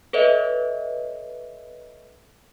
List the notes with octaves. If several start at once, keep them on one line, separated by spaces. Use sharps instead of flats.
A4 B4 C#5 D#5 E5